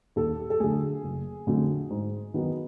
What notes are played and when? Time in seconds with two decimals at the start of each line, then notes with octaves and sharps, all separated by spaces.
0.16 D#2 A4
0.50 A4
0.60 D3 F#3 A3 G#4
1.03 F#1
1.47 F2 D3 F#3 A3
1.90 G#2
2.34 D#3 F#3 B3